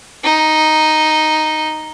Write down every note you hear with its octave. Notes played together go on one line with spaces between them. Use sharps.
D#4